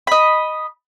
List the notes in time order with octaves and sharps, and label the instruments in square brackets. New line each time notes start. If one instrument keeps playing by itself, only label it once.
[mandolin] D#5 B5